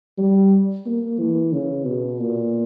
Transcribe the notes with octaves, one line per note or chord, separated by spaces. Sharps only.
G3
A#3
E3
C#3
B2
A#2